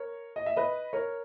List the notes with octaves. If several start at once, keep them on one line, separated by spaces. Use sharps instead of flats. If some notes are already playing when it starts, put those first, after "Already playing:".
Already playing: A#4 C#5
D#5
E5
B4 D#5
A#4 C#5